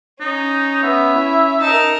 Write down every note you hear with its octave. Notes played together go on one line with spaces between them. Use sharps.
C#4 D#4
B3 E5
E4
D#4 A#4 A5